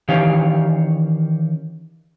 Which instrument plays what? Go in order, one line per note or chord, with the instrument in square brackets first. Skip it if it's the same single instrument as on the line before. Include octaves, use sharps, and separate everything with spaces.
[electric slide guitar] D#3 E3 C#4 G4 C#5 F5